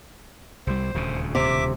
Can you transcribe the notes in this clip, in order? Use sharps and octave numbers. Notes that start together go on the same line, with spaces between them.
C2 G3 C5
D#1 D2 C#3
C3 E5 D6